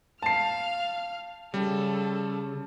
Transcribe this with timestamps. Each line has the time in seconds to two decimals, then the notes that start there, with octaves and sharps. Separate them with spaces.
0.22 F5 A5 F6 C7
1.54 C#3 G3 A4